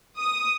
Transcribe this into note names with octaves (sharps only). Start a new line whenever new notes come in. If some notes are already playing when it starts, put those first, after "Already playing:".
D#6